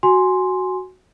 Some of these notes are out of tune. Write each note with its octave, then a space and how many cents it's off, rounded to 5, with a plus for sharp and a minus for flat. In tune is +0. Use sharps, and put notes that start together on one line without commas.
F#4 +5 G#5 +0 C6 +0